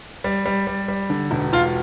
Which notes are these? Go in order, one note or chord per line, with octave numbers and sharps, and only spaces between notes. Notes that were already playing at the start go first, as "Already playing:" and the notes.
G3
G3
G3
G3
D3
E1
E1 F4